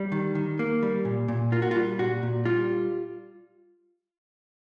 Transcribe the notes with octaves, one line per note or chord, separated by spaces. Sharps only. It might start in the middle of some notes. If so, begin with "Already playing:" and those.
Already playing: G3
D#3
D#3
A#3
G3
A#2
A#2
A#3 F4
F#4
F4
G3
A#2 F#4
A#2
G3 F4